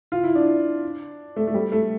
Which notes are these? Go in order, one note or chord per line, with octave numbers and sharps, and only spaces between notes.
F4
E4
D4
A3
A3
G3
A3